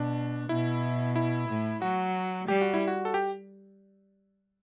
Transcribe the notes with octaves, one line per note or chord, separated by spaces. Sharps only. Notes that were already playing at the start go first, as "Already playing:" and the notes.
Already playing: B2 D4
B2 E4
E4
A2
F#3 F#4
G3 G4
F#4
E4
F#4
A4
G4